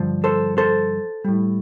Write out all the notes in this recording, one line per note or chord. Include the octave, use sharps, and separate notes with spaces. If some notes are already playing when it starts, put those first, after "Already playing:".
Already playing: G2 D3 F3
A4 C5
A4 C5
A2 G3